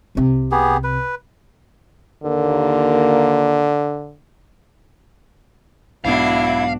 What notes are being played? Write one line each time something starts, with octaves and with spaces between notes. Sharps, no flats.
C2 C3
B3 G4 G#4
B4
D#2 A#2 D3 A#3
B1 G#2 B3 D4 E4 F#4 F5